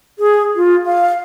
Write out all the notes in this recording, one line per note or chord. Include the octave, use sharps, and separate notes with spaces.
G#4
F4
F5